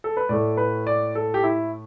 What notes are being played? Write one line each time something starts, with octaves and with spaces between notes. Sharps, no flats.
A4
B4
A2 A3 D5
B4
D5
A4
G4
E4